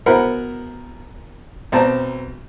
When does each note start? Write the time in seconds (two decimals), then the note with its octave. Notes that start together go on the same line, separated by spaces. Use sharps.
0.06 B2 E4 A#4 C5 F#5 B5
1.72 B1 C4 A5 A#5